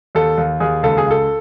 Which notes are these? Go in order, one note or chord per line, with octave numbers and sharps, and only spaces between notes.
D#2 A4
D#2
D#2 G#4
C#2 A4
G#4
C#2 A4